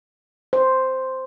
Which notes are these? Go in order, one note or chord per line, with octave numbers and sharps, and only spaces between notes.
C5